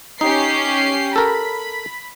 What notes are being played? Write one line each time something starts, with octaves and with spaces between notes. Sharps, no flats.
C#4 D#4 G4 C7
A4 A#4 B5